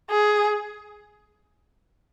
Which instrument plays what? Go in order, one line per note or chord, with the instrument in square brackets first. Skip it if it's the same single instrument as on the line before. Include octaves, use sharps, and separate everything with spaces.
[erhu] G#4